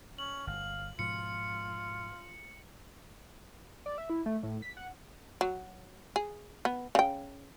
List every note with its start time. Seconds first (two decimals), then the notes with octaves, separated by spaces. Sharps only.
0.18 C#4 F#7
0.47 G1 F5
0.99 G#2 B2 F3 F4 C#7
3.86 D5
3.98 E5
4.10 E4
4.26 A3
4.43 A2
4.62 B6
4.77 F#5
5.41 F#3
6.16 G#4
6.65 B3
6.95 C#3 G5